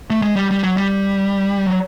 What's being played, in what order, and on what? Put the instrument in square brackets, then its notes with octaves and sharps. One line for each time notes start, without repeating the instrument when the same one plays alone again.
[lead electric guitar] A3
G#3
G3
G3
F#3
G3
F#3